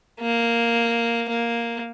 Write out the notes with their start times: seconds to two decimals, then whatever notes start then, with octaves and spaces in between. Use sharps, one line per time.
0.21 A#3
1.29 A#3